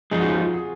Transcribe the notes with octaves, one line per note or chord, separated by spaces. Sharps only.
G#2 F3 G#3 D#4 G#4
F#4
F4
F#4
G#4